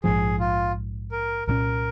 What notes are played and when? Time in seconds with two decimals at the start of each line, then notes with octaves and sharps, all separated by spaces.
0.04 A#1 G#2 F3 G#4
0.40 F4
1.12 A#4
1.47 C2 A#2 G#3 C#4 A#4